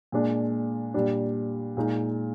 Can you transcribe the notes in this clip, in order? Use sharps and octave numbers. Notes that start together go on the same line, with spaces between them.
A#2 G#3 D4
A#2 G3 D4
A#2 G#3 D#4